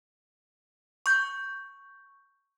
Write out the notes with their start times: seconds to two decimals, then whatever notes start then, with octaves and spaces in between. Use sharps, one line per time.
1.06 C#6 G6